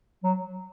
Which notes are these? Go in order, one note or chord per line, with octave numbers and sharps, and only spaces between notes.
F#3